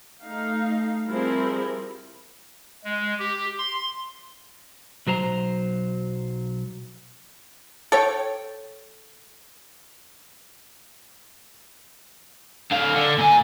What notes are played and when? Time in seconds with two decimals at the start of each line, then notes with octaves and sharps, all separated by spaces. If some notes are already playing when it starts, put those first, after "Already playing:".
0.23 A3 D#4 F5
1.09 F3 G3 C4 E4 G#4 A#4
2.84 G#3
3.19 G4
3.59 C6
5.07 B1 F#3 C5 A#5
7.92 A4 C#5 G5
12.71 D3 F5
12.95 D3
13.18 A#2 G#5